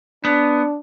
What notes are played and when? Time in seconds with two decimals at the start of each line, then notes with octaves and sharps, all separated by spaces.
0.25 B3 D4